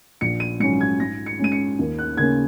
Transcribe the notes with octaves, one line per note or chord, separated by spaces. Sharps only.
A#1 C#7
D#7
G#2 D#3 F#3 C#4 C#7
G#6
G#2 A#6
C#7
G#3 C#4 D#7
C#7
D#2
F#6
C#3 A#3 C#4 G#6